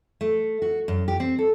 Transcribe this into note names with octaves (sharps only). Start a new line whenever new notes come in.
A3
F#4
F#2
G4
C4
A4